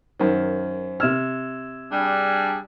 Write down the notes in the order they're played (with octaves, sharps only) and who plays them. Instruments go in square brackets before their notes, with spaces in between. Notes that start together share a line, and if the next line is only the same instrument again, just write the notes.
[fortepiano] F#2 D#3 [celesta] C5
[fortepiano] C3 F6 [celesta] E6 G#6 E7
[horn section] G3 D4 G#4